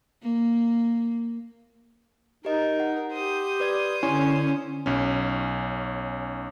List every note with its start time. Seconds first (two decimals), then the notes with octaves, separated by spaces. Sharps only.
0.23 A#3
2.45 D#4 G4 A#4 D#5
2.80 F#5
3.12 G4 C5 D#6
3.60 B4 D5 G#6
4.03 D3 C#4 E4 G#5 C6
4.86 B1 C#4